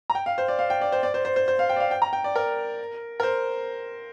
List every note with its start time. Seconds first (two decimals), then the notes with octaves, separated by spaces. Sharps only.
0.10 A#5
0.15 G5
0.26 F5
0.38 C5
0.48 D5
0.59 F5
0.70 G5
0.81 D5
0.92 C5
1.03 D5
1.14 C5
1.25 C5
1.36 C5
1.48 C5
1.59 F5
1.69 G5
1.76 D5
1.80 F5
1.91 G5
2.02 A#5
2.13 G5
2.24 D5
2.36 A#4
3.20 A#4
3.23 C5